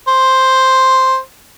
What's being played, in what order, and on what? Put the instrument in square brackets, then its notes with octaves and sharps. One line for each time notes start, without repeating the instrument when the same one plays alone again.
[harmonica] C5